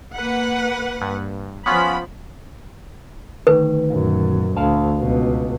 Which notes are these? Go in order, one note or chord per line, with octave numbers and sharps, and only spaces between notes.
A#3 B4 F#5
G2
F3 B3 C#4 F4 B5
D2 D#3 B4
F#2 A#2
D2 F5 A5
C#2 B2